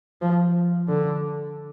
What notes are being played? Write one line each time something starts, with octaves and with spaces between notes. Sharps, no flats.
F3
D3